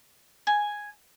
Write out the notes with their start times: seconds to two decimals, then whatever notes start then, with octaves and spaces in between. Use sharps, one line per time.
0.47 G#5